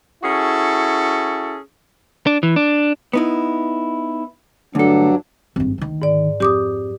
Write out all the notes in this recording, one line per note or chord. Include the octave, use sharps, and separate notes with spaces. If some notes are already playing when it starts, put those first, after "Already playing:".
C#4 E4 F#4 G#4 A4
D4
E3
D4
B3 D#4 E4
D2 G2 F#3 D4 A4
G#1 G2
D2 D#3
G#2 D5
F2 G4 D6 D#6